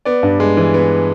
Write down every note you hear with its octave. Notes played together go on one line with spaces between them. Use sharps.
B3 D5
G2
G#3
E3
B3